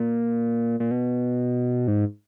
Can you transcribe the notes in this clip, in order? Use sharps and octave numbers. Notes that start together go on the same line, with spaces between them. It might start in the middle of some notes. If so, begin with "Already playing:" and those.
Already playing: A#2
A#2
B2
G#2